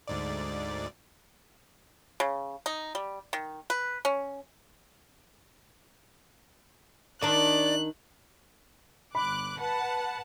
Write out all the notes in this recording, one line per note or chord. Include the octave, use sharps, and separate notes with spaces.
D2 G#2 D5
C#3
D#4
G3
D#3
B4
C#4
D#3 D4 D5 F#6
G1 B5 D6 F#6
B4 F#5 A5